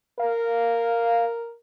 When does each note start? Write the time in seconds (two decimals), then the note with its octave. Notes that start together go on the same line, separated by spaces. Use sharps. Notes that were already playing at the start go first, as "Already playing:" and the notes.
0.19 A#4 F5